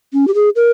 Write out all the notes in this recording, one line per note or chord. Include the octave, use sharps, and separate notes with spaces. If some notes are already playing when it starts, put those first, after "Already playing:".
C#4
G4
G#4
A#4